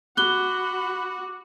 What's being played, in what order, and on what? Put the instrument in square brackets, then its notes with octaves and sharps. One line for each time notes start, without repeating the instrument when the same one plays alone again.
[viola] F#4 [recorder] B5 [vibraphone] D6 [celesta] F#6 G7